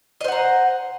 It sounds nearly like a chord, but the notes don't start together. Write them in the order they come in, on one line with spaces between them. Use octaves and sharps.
D#5 C5 F#5 A#5